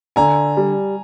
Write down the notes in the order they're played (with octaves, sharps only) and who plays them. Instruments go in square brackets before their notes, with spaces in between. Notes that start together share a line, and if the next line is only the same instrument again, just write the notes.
[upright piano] D3 [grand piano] G#5 A#5
[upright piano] G3